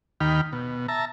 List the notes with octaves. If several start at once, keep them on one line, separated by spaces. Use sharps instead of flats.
D#2 D#3 G5 B5 F6
B2
E5 A5 A#5